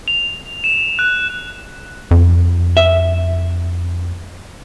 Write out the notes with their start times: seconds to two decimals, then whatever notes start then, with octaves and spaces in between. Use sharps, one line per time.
0.08 F7
0.64 E7
0.99 F#6
2.11 F2
2.77 E5